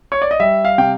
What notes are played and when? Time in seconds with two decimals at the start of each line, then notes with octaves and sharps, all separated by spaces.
0.12 C#5
0.22 D5
0.31 D#5
0.40 G3 E5
0.65 F5
0.78 C3 G5